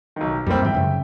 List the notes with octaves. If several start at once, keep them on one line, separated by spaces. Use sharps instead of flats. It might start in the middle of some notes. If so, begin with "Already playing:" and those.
B1 D#3
F2 G3 A#3 C4
G#2 E3 E5 G5
F#2 C#3